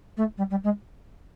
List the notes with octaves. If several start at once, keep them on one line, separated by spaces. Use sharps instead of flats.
A3
G3
G3
G#3